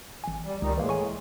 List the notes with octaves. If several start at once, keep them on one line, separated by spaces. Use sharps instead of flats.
A1 G#5
G3
C#2 D#3 G3 D#4
A2 E3 G#3 A#3
G#5 C#6